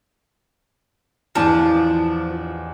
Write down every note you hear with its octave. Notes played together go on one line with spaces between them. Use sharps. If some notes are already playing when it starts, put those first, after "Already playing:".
A1 E2 F3 D4 A5